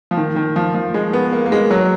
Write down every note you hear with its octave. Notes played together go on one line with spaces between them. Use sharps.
F3
D#3
D#3
F3
F3
G#3
B3
A#3
A#3
G#3
F#3